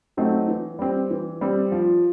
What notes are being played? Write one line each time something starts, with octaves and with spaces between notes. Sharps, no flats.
F#3 A3 C4 D#4
E3
G3 C4
E3
G3 C4
F3